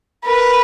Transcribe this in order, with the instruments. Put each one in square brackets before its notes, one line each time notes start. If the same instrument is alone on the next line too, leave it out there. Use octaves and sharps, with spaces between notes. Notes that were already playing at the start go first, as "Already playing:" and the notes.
[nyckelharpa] A#4 [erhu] B4